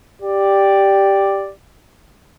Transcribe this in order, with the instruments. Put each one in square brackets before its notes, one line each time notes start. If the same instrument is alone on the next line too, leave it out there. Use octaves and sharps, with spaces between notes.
[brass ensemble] G4 D5